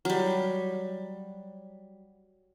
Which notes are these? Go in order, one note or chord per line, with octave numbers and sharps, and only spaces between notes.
F#3 G3